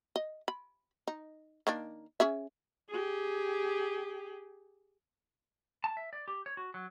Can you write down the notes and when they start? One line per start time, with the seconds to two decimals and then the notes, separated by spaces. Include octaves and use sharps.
0.16 D#5
0.48 B5
1.08 D#4
1.67 D#3 A#3 D4
2.20 C#4 G#4 E5
2.90 G4 G#4
5.84 A5
5.97 E5
6.13 D5
6.28 G4
6.46 C#5
6.57 F#4
6.74 F#3